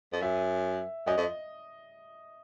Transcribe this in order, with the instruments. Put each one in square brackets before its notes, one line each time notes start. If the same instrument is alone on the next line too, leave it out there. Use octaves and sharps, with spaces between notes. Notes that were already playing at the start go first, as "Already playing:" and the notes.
[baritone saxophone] F2
[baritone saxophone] F#2 [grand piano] E5
[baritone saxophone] F#2 [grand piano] D#5
[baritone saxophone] F2